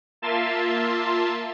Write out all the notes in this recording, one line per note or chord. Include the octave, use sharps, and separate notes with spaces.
A#3 F4 E5 A5 C6 A6